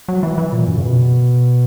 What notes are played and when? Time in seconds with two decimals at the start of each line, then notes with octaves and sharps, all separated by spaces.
0.09 F#3
0.23 E3
0.38 E3
0.53 A#2
0.67 F#2
0.78 C#3
0.82 B2